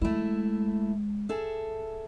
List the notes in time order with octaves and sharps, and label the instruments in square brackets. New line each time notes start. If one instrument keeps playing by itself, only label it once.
[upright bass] G#3 [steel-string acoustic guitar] A3 E4
[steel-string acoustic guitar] G#4 A4 E5